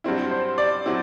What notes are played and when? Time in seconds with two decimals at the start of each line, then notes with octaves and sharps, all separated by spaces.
0.04 G2 F#3 C4 E4
0.31 C5
0.58 D5
0.86 F#3 C4 E4